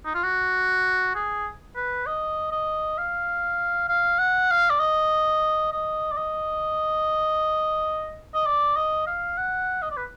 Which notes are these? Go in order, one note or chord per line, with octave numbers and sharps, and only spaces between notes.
D#4
F4
F#4
G#4
B4
D#5
D#5
F5
F5
F#5
F5
D5
D#5
D#5
D5
D#5
D#5
D5
D#5
F5
F#5
D#5
D5
B4